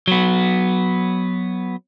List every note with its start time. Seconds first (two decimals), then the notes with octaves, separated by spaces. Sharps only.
0.08 F#3 B3